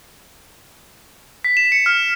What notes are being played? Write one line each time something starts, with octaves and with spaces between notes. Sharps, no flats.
B6
E7
C#7
F6